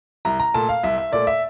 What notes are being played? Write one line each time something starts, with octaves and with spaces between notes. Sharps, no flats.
C2 A#5
A#5
A#2 A3 A5
F5
C2 E5
E5
A#2 A3 D5
E5